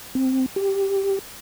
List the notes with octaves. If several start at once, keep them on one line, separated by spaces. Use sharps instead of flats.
C4
G4